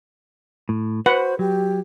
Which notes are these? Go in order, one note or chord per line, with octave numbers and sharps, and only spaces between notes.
A2
F#4 B4 C5 F#5
F#3 G4